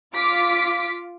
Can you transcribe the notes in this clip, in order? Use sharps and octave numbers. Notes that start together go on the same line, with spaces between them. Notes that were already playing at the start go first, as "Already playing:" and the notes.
F4 D6 B6